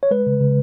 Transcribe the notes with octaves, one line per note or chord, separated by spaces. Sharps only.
C#5
G#3 B4
C#3
C#3